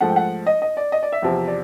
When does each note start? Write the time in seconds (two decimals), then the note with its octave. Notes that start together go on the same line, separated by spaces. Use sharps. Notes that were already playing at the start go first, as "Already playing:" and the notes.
0.01 G#2 F3 A3 F#5
0.09 G5
0.16 F#5
0.47 D#5
0.62 D#5
0.77 D5
0.92 D#5
1.03 D5
1.12 E5
1.22 E2 C3 F3
1.48 D5